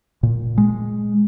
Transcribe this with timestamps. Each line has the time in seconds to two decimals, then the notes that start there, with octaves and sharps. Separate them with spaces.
0.23 A#2
0.58 G#3